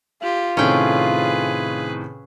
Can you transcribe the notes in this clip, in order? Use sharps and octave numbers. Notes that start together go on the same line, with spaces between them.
F4 G4
A2 C3 D#3 C#4 G#4 B4 G5